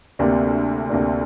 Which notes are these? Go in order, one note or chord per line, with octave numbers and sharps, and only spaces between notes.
D2 C3 A#3 D4
D2 C3 A#3 D4